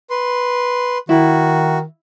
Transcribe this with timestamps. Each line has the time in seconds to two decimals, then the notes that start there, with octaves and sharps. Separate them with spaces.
0.10 B4 C6
1.09 D#3 E4 F#4